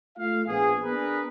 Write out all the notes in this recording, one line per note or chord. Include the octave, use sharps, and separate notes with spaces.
A3 F4 F5
A#1 B3 G#4
B3 D4 G#4 A#4 B4